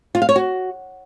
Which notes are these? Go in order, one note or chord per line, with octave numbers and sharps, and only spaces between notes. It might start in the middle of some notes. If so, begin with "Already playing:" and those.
F4
F5
C#5
F#4